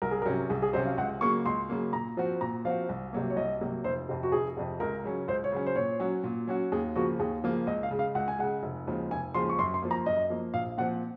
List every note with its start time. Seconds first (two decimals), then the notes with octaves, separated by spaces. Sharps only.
0.02 C2 A#4
0.11 G#4
0.22 A#4
0.26 C3 F#3 C#4
0.50 C2 G#4
0.62 G#4
0.73 C3 F#3 C#4 C5
0.86 F5
0.98 C#2 F#5
1.21 C#3 F#3 A#3 C#6
1.45 C#2 C6
1.69 C#3 F#3 A#3
1.93 A#2 A#5
2.17 F3 C4 F#4
2.41 A#2 A#5
2.65 F3 C4 F#4 F5
2.89 C2
3.13 C3 F#3 A#3
3.30 C#5
3.37 C2 D#5
3.61 C3 F#3 A#3
3.84 F1 C5
4.09 F2 C3
4.23 F#4
4.32 F1 G#4
4.57 F2 C3
4.80 C#2 A#4
5.04 C#3 F#3 C#4
5.28 C#2 C5
5.44 C#5
5.52 C#3 F#3 C#4
5.66 C5
5.76 A#2 C#5
6.00 F#3 C#4 F#4
6.24 A#2
6.47 F#3 C#4 F#4
6.72 D#2 G#4
6.96 C#3 F3 A#3 F#4
7.19 D#2 G#4
7.43 C#3 F3 A#3
7.67 C#2 D#5
7.83 F5
7.91 C#3 G#3
7.99 F5
8.15 C#2 F#5
8.28 G#5
8.39 C#3 G#3 F#5
8.63 F1
8.87 D#2 C#3 F3 G#3
9.11 F1 G#5
9.34 D#2 C#3 F3 G#3 C6
9.49 C#6
9.59 F#2 C6
9.74 C6
9.82 F3 A#3
9.91 A#5
10.06 F#2 D#5
10.30 F3 A#3
10.54 A#1 F5
10.78 A#2 F3 C4 F#5